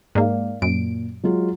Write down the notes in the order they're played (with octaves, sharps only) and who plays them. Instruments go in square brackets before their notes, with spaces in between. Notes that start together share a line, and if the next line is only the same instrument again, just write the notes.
[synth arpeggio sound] G#2 A#3 [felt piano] D5 F5
[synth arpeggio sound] F#2 D7 [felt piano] A#2
[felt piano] F#3 G#3 F4